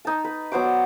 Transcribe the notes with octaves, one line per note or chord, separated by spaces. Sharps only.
D#4 A5
B4
F#3 B3 C5 D6
D5